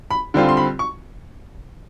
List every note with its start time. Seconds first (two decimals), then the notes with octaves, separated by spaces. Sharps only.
0.11 B5
0.34 D3 G3 C4 F4
0.49 C6
0.57 B5
0.79 C#6